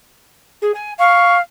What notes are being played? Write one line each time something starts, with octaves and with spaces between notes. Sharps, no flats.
G#4
G#5
F5 C#6